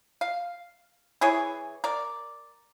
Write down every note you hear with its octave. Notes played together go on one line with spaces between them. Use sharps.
F5
E3 E4 G#4 C#5
A#4 D5